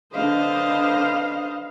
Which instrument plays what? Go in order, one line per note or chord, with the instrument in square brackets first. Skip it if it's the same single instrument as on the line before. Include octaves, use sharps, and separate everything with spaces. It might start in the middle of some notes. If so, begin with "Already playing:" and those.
[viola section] D3 C5 D#5 [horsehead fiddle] B4 F5